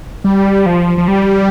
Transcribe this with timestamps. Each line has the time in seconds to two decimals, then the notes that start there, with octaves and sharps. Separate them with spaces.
0.24 G3
0.66 F3
0.98 F3
1.08 G3